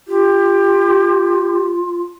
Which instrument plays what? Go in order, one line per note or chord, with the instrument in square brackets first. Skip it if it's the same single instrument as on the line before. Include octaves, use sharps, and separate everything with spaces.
[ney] F4 [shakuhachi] G4